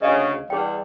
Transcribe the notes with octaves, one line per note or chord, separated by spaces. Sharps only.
D2 C#3 D#5 F5
E2 G3 G#4 G5